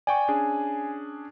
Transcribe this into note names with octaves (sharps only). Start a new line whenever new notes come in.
D5 G5 G#5 C#6
C#4 D4 G#4